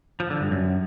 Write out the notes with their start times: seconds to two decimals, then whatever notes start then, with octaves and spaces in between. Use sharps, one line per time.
0.20 F3
0.30 D3
0.41 G2
0.51 F#2